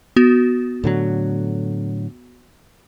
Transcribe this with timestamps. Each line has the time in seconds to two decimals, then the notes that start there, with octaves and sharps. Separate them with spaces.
0.16 B3 F#4
0.84 A2 D3 F#3